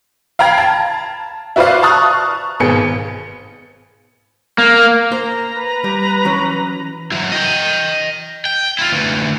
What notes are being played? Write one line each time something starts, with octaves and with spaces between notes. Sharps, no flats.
F5 G5 A#5 B5 G#6
A5
E4 F#4 B4 C5 D5 F5
A5 A#5 C#6 D#6 F6 F#6
G#1 B2 G#4 C#7
A#3
A#3 C5 A#5
B4
G3
E3 F#3 C#4
F#3 E4
D#5 G5
G5
E4 F4
D2 E3